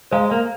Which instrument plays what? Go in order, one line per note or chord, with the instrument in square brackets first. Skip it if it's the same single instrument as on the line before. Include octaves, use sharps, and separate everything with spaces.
[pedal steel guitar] G#3 [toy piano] C5 F5 A#5
[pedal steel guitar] A#3